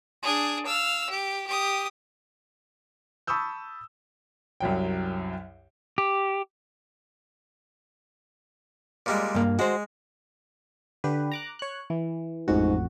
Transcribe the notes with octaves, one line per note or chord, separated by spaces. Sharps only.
D4 G#4
F5 E6
G4
G4 D#6
A5 B5 C#6 D#6 E6 G6
C2 F#2 F#3 G5
G4
A#2 G3 G#3
G2 A#3
G#3 F#4 C5
D3 G4 B4
A#5 D6 F#6
C#5 F#6
E3
A1 F2 G#2 F#4